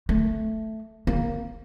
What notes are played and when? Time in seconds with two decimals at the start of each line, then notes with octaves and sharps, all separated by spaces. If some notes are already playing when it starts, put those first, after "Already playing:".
0.09 A3
1.07 A#3